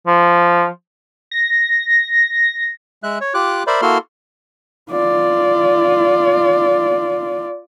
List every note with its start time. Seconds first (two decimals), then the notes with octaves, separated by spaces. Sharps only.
0.07 F3
1.31 A#6
3.03 G#3 E5 F#6
3.21 C#5
3.34 F4 G4 D6 F#6
3.67 A#4 C5 D5 E5 B5
3.82 A#3 E4 F#4 A4 C6 F6
4.91 F4 D5